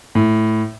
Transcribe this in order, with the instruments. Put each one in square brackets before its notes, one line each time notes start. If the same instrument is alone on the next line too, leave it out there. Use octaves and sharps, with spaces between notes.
[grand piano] A2